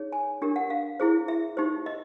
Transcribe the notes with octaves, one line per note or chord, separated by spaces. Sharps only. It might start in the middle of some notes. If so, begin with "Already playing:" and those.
Already playing: D#4 G#4 C#5
G#5
D4 G4 A#4
F#5
F5
E4 G#4 C5
E5
D#4 G4 C5
D#5